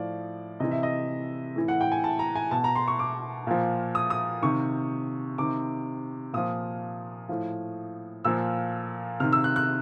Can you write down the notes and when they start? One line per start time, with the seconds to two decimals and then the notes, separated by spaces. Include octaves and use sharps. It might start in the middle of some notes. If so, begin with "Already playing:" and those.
Already playing: A2 F3 D5
0.60 C3 E3 D#5
0.71 E5
0.83 D#5
1.56 A2 E3
1.68 F#5
1.81 G5
1.92 G#5
2.04 A5
2.19 A#5
2.36 G#5
2.51 B2 A5
2.64 A#5
2.75 C6
2.88 C#6
2.99 D6
3.47 A#2 F3
3.95 D#6
4.10 D#6
4.42 C3 D#3 C#6
5.38 C3 D#3 D6
6.33 A#2 F3 D#6
7.29 A2 F3
8.25 A#2 F3 E6
9.20 C3 D#3 F6
9.33 E6
9.44 F#6
9.56 F#6